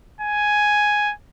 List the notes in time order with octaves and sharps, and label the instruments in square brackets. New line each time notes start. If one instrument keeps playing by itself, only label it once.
[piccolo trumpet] G#5